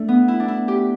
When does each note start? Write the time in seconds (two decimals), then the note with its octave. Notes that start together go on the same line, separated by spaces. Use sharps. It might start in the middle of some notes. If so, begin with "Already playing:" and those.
Already playing: A3 D4
0.08 B3
0.28 E4
0.40 D4
0.48 E4
0.68 G4